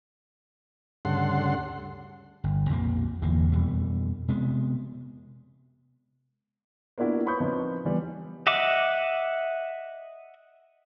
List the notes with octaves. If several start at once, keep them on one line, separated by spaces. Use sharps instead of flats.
D2 G2 C#3 A4 F#5 C6
G1
B1 F2 A#2 A#3
G1 E2 E3 A#3
F2 B2 E3 G3
C3 G#3 B3
A#3 B3 D4 E4 F#4
B4 C#5 B5 C#6 D#6 G6
F3 C4 D#4 B4 C#5
E3 G3 B3
D#5 E5 F#5 D6